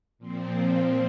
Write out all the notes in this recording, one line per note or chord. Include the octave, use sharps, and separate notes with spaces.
A#2 F3 C4